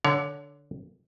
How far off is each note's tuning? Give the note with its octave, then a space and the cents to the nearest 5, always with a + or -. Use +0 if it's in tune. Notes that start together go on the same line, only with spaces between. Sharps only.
D3 +0 C#5 +30